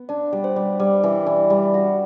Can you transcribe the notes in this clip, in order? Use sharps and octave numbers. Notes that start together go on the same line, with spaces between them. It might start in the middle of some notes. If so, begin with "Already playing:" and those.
Already playing: B3
D4 D5
G3
C5
G3
G3 D5
E3
E3
G3
F#4